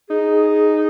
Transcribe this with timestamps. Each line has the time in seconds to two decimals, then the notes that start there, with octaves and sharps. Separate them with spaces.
0.10 D#4 G#4